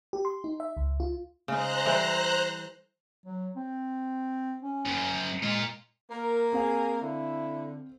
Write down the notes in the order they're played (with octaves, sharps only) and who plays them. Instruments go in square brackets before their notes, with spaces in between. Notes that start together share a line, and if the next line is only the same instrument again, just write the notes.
[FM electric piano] G4
C6
D#4
E5
C#2
F4
[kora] C#3 G#3 D#4 [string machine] C5 A#5 F#6
[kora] E3 G3 A4
[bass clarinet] F#3
C4
C#4
[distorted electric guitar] F#2 C#3
[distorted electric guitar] A#2 F4 [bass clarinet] G#3
[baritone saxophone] A#3 [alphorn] A#4
[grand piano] C4 F5 [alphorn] G#4
[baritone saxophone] D3 [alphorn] E4